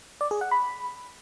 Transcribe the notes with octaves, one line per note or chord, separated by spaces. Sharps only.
D5
G#4
F#5
B5